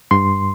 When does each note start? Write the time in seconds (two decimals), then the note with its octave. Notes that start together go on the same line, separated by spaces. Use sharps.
0.11 G2 C6